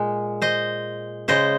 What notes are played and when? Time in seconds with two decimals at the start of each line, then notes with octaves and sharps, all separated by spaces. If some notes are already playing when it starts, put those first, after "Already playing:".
Already playing: A#2 G#3
0.42 C5 D#5
1.28 C#3 G#3 C5 D#5